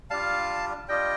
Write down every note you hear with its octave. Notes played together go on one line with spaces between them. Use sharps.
G3 D4 F4 F5 A5
G3 D4 F4 D#5 G5